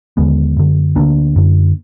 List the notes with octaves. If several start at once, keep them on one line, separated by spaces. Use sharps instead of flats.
D#2 D3 G#3 B3
F#2 D3
D2 D3 A#3 D4
F#2 D3